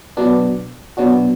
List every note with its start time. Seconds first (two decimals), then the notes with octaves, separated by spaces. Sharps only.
0.17 B2 F#3 B3 D4
0.97 B2 F#3 B3 D4 F#4